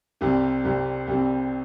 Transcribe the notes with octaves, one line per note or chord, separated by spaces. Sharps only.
C2 C3 G3 C4
C2 C3 G3 C4
C2 C3 G3 C4